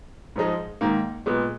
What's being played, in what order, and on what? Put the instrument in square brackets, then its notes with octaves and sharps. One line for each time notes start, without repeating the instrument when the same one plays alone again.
[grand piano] G#2 F3 G#3 D#4
G#2 D#3 A#3
A#2 G#3 B3